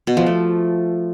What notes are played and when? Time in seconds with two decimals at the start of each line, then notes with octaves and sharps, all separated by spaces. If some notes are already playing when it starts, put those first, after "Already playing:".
0.07 B2
0.17 F3
0.26 A3